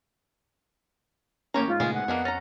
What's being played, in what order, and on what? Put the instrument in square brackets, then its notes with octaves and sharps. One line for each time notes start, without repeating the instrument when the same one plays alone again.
[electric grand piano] A1 A#3 C#4 [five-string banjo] G4 C#5 A#5
[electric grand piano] G#2 [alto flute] F4
[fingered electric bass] A#2 C#3 A3 [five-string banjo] G#3 B3 G#4
[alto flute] F#5
[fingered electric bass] F2 [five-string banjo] A#3 D4 G#4 [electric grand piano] B3 B4 D#5
[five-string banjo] C#4 A#5 [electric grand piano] A6 A#6